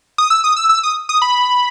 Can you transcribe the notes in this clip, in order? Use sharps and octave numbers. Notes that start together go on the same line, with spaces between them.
D#6
E6
D#6
E6
E6
D#6
D#6
B5